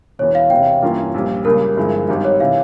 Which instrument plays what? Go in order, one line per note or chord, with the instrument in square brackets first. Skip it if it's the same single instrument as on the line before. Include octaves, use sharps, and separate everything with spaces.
[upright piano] E1 E2 E3 [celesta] C#5
[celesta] F5
[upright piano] E1 E2 C3 [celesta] G5
[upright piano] G2 E3 A#3 C#4 F4
A#1 A#2 G3
[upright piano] C#2 C#3 G3 A#3 [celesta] A#4
[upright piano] G1 G2 F3 G#3 E4
G#1 G#2 G3
[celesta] C#5
[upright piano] C3 E3 [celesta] F5